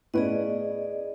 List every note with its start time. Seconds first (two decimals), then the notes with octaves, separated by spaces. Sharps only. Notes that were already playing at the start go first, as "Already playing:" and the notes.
0.14 A2 B3 C#4 G#4 D5 D#5